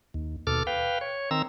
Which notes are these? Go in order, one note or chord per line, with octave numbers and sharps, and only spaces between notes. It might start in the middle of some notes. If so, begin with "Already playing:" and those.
D#2
D#2 B2 A4 D6 F6
B4 F5 G5
C#5
D#3 C4 A#5 E6